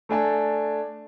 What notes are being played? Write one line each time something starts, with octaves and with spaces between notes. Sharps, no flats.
A3 D4 G#5 A5